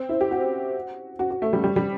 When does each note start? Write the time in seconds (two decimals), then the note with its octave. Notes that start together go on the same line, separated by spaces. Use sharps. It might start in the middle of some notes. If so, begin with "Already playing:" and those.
Already playing: C4
0.09 E4
0.21 G4
0.31 F#4
1.19 F#4
1.30 F#4
1.42 A3
1.53 G3
1.64 G3
1.76 G3